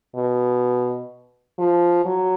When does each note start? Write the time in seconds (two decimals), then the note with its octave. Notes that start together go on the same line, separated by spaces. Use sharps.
0.15 B2
1.59 F3
2.05 F#3